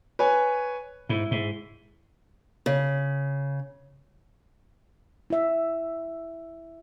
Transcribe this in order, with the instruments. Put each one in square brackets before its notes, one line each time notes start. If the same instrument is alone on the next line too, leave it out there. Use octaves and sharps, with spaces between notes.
[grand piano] B4 C#5 G#5
[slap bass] G#2 [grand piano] E4
[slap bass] G#2
[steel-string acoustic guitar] C#3
[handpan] E4 E5